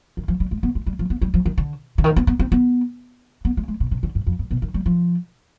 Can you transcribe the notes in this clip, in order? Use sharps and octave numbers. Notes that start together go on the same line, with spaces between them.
D#3
F3
G3
G#3
B3
G#3
G3
F3
B3
G3
F3
D#3
D3
D3
D#3
B3
B3
C4
B3
B3
G#3
G#3
B2
C3
D3
G2
F2
G2
B2
D#3
G3
F3